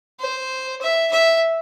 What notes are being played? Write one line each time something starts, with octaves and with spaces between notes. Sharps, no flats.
C5
E5
E5